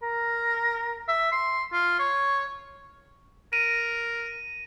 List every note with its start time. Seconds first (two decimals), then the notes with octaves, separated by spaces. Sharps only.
0.02 A#4
1.08 E5
1.32 C6
1.73 F4
1.99 C#5
3.53 A#4 D#7